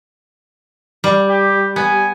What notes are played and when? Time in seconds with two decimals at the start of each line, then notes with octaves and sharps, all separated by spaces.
1.04 G3
1.29 G4
1.76 B3 G#5